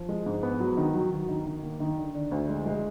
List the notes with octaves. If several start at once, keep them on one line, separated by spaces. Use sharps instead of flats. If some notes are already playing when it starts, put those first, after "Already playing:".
Already playing: F3
G#3
G#2
B3
F#3
D#3
F#3
F#3
D#3
D#3
A#3
D#3
D3
D4
D2
G#3
G#3